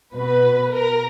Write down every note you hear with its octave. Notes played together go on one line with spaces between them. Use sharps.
B2 B4
A#4